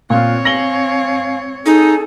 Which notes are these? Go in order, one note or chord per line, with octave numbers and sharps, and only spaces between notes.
A#2 C4 F4 C#5 F5 F#6
F5 G#5 A#6 F#7 G7
D#4 G#4 A4 G#5